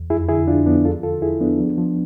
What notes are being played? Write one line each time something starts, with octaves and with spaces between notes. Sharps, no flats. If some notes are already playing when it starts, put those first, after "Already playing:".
Already playing: E2
F2 E4 G#4
D3 E4 G#4
F2 D4 F4
F3 B3 D4
E2 F4 A4
D3 F4 A4
E2 E4 G#4
F3 B3 D4
F3
F3